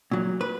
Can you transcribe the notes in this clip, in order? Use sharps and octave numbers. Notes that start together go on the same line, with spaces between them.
A#2 F#3
B4